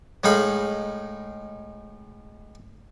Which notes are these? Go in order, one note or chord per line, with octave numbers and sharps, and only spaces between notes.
A2 G#3 D#4 F5 B5